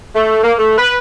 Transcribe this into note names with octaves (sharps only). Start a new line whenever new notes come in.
A3
A#3
A3
B4